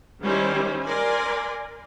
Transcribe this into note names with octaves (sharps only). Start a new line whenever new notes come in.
D#3 G3 C#4 E4 C5
A#4 D5 G#5 C6